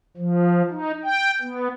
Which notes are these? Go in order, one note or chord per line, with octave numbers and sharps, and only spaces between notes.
F3
D#4
G5
B3